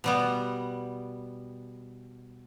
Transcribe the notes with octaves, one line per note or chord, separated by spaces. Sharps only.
B2 G3 B3